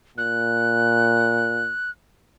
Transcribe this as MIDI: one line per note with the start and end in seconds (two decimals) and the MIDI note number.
0.18 1.73 46
0.18 1.90 90